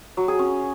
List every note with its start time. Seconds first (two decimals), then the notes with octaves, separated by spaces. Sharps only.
0.17 F#3
0.28 G#4
0.39 C#4